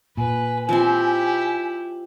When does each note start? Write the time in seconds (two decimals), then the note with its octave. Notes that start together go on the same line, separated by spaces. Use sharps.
0.17 A#2 B4 G#5
0.69 F3 C4 E4 G4 C6